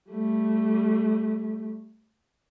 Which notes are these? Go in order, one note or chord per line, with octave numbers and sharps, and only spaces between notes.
G3 A3